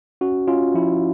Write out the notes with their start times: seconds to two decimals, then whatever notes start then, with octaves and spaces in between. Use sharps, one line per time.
0.21 C#4 F#4
0.48 C#4 F4
0.74 F3 E4